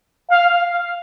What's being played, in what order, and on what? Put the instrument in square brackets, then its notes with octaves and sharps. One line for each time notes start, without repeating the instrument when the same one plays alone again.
[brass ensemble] F5